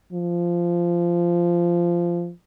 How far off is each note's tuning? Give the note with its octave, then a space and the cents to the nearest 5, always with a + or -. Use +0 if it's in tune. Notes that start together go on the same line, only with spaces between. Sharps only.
F3 -15